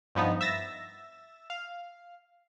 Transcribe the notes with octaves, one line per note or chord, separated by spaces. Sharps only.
G2 F3 B3 D#4
E5 E6 A6 A#6
F5